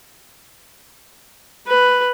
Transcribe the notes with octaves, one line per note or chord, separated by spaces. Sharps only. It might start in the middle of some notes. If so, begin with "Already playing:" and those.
B4